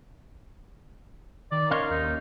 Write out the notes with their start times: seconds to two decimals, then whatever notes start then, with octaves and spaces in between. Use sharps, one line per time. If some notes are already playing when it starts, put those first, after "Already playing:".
1.52 D#3 D5
1.71 C#4 A#4 C#5 D#5 F5 C6
1.91 D#2 D#4